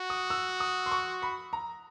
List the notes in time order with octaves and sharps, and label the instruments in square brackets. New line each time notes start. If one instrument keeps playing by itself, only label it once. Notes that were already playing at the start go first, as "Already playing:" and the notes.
Already playing: [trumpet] F#4
[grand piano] D#6
E6
D#6
C6
C#6
B5
A#5